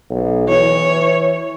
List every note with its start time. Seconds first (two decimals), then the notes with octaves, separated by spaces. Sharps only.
0.10 B1
0.48 E3 C#5